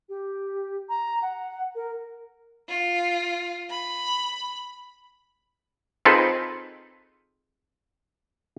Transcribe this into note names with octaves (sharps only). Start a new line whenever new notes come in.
G4
A#5
F#5
A#4
F4
B5
C4 D#4 F4 G#4 A4 B4